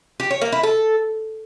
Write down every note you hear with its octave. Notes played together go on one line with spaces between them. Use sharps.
G4
C#5
A#3
E4
A4